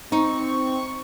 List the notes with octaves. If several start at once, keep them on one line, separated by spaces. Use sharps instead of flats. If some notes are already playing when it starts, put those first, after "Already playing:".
C4 D#4 C#6